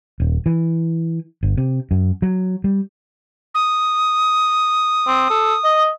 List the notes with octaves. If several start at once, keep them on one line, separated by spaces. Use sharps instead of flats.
D#1
E3
G1
C3
F#2
F#3
G3
D#6
C4
A4
D#5